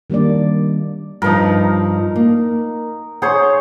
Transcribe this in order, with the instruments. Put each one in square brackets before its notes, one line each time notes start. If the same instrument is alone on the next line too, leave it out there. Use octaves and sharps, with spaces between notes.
[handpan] D#3 G3 A#3 D4 D5
[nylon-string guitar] G2 F3 [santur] D#4 A#4
[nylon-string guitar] A#3
[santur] G#4 C5 C#5 [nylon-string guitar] F#5